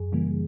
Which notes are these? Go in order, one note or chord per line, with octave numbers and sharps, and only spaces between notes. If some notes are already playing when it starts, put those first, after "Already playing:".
Already playing: F#2 G#4
C#3 E3 G3 A#3